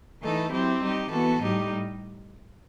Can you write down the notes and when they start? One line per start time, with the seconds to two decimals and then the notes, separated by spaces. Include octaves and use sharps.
0.22 E3 A3 D#4 A4
0.52 F#3 C4 E4 G4
0.81 G3 D#4 G4
1.11 E3 B3 F#4 A4
1.41 A2 G3 D#4 G4